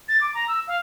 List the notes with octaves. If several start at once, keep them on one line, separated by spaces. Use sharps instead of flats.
A6
D6
A#5
E6
F5